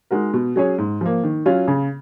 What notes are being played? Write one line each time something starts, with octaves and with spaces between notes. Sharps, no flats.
G#3 D#4 F#4 A#4
B2
F#3 C#4 G#4 C#5
G#2
F3 A#3
D#3
F#3 C#4 F4
C#3